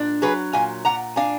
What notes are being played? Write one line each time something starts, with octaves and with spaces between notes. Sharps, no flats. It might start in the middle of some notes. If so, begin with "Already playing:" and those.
Already playing: A#2 D4
F#3 G#4 B4
A#2 F5 G#5
A#2 F#5 A#5
D4 F5 G#5